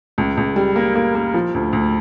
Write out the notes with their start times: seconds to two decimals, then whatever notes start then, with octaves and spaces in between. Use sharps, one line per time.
0.18 C#2
0.37 C#2
0.56 G3
0.76 A#3
0.95 A#3
1.15 A#3
1.34 F3
1.54 D2
1.73 D2